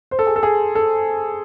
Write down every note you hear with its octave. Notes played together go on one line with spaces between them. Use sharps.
C5
A4
G#4
A4
G#4
A4